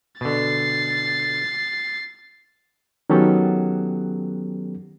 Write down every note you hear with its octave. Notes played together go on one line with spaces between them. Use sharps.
B2 D3 A6 C7
D#3 F#3 B3 C#4 G4 A4